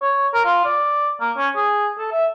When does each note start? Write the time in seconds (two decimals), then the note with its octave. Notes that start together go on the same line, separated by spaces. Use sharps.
0.02 C#5
0.34 A#4
0.45 F4
0.65 D5
1.21 A#3
1.37 C#4
1.56 G#4
1.99 A4
2.12 E5